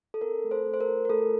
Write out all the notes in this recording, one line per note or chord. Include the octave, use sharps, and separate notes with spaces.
A4
C4 A#4
A3
A4 C5
A3
C5
A#4
F4
A#4
A3 A4